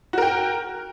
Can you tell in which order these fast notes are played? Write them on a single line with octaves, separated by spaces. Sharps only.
F#4 A#4 G5